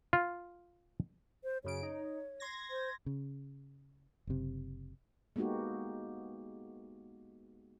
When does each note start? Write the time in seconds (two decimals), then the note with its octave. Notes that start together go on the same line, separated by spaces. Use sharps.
0.13 F4
1.44 C5
1.64 F#2 C#3 C#5 D7
1.82 D#4
2.40 C6 G#6 A#6
2.70 C5
3.06 C#3
4.27 F#1 C3
5.36 G#3 A#3 B3 D#4 F#4 G4